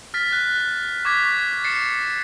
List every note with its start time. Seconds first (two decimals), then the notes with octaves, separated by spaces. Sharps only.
0.14 F6 A6 B6
0.33 F#6
1.05 C#6 D6 G#6 B6
1.64 A6 C7 C#7 E7